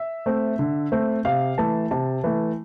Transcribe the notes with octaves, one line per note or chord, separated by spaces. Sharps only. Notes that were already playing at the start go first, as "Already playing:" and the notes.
Already playing: E5
A3 C4
D3
A3 C4
C3 F5
E3 A3 A5
C3 A5
E3 A3